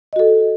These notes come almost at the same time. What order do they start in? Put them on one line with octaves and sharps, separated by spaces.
D#5 F#4 A4